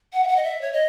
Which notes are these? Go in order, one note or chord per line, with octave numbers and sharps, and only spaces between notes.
F#5
E5
F#5
D#5
E5
C#5
D#5